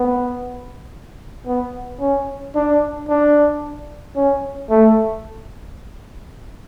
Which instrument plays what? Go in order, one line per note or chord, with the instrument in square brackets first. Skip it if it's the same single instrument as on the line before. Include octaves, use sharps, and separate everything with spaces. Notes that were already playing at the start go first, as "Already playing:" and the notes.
Already playing: [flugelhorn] B3
B3
C#4
D4
D4
C#4
A3